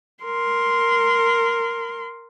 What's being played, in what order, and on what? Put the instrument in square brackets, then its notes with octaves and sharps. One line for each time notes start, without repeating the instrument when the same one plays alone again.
[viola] A#4 C6